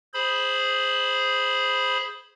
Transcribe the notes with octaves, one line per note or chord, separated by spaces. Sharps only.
G#4 C5 B5